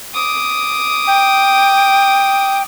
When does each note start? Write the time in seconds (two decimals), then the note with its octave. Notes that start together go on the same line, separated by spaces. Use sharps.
0.14 D6 D#6
1.07 G5